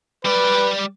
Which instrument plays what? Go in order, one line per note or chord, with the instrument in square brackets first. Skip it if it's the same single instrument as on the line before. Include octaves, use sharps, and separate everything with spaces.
[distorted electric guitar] G3 D5 [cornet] B4